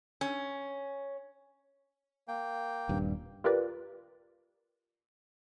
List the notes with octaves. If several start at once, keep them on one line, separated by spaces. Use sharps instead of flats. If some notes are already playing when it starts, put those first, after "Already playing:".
C#4
A#3 G5
D#1 G2
F4 G4 A#4 B4 D5